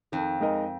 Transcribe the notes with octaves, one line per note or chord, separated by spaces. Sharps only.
F2 D#3
G#3 D#4 A#4 D#5